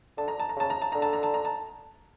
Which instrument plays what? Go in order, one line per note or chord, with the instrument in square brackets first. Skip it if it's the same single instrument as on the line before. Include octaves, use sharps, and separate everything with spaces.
[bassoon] D3 [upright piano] A5
[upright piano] A#5
A5
A#5
[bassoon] C#3 [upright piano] A5
[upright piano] A#5
A5
[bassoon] D3 [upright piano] A#5
[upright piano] A5
A#5
A5
A#5
A5